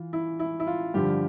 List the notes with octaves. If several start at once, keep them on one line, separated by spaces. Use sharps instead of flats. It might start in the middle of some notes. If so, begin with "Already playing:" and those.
Already playing: E3 F4
E4
E4
E4
F4
G2 D3 F3 G4